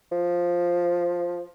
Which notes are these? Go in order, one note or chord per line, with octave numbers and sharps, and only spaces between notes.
F3